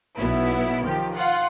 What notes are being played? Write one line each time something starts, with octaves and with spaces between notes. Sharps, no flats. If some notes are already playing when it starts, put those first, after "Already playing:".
B1 B2 B3 E4
D#3 F3 G4
F4 F#5